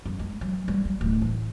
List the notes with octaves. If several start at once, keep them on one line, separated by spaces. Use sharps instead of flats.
F#2
G#3
F#3
G3
G3
D1
A1